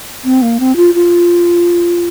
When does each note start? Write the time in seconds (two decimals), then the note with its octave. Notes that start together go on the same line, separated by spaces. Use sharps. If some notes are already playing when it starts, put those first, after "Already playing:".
0.24 C4
0.42 A#3
0.60 C4
0.76 F4
0.94 F4